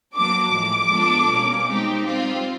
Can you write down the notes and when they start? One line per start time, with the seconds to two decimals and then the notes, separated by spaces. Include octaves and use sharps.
0.15 F#3 A#3 D4 D6
0.52 A2 F3 G#3 D6
0.91 G#3 B3 D4 F4 A4
1.29 B2 G3 A#3 C#4
1.67 G#3 C4 D#4 G4
2.05 G3 C4 F4